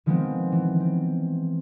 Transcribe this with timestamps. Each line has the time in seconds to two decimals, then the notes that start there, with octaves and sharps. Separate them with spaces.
0.06 D#3 F3 G#3 B3 C4
0.52 E3
0.80 C4